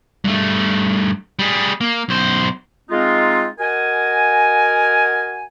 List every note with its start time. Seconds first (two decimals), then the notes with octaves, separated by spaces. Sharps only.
0.24 G2 A3
1.39 G3 G#4
1.81 A#3
2.09 B1 C5
2.90 G#3 C4 D#4 F4
3.59 F#4 A#4 D#5 F#5 G#5